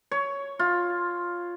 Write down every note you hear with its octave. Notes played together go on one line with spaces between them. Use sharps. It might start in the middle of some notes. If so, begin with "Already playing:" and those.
C#5
F4